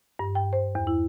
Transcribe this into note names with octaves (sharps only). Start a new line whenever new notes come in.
G2
G5
C5
E2
E4